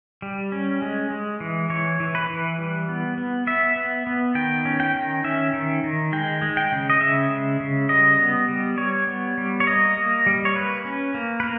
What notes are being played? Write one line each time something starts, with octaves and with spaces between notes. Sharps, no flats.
G3
C#4
G#3
G#3
E3
E3 C#5
E3
B4
E3
G3
B3
B3
B3 E5
B3
B3
D#3 G5
C#4
G5
D#3
C#4 E5
D#3
D#3
G#3 G5
G#3
G5
C#3
D#5
C#3 E5
G#3
C#3
G3 D#5
B3
G3
G3 C#5
B3
G3
C#5
A#3 D#5
A#3
G3
C#5
A#3 B4
C#4
A#3
B4
A#3